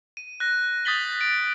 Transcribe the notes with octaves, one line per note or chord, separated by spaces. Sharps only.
D#7
F#6 A#6
D#6 G6 A6 B6 F#7 G7
A6 D7